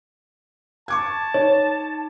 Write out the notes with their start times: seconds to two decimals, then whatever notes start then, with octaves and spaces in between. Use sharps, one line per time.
0.88 A5 C#6 D6 G#6
1.34 D#4 C#5